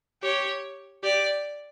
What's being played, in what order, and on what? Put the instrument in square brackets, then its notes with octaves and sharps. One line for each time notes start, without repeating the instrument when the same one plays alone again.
[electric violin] G4 [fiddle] C#5
[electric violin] G4 [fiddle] D5